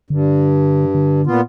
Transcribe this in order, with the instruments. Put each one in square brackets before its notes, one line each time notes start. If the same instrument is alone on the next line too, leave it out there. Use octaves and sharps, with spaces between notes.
[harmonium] G2 [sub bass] D3
[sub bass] D3
[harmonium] A#2 B3 F4